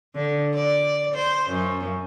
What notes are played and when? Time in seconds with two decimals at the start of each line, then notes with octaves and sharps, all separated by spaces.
0.14 D3
0.54 D5
1.15 C5
1.50 F#2